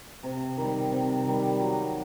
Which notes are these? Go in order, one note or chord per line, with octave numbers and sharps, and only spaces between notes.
C3
D#3 G3
C3
D#3 G3
F#3